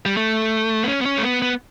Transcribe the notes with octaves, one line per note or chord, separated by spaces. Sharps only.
G3
A3
B3
C#4
B3
C#4
A3
B3
B3